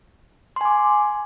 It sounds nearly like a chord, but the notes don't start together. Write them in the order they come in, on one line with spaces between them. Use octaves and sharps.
C6 G#5 D6